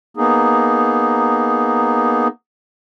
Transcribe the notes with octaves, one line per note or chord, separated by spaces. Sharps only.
A#3 B3 D#4 G#4